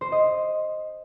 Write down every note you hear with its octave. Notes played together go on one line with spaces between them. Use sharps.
C5
D#5